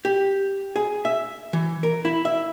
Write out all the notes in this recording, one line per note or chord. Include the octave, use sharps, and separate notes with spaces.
G4
G#4
E5
E3
A#4
E4
E5